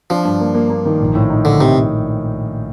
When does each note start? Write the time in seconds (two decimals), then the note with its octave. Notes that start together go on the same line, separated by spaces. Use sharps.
0.10 F3 D4
0.25 G2
0.40 A#3
0.54 A#3
0.70 A#3
0.85 D#3
1.00 A#1
1.15 A2
1.30 D#4
1.45 A#1 D3
1.60 C3 D#4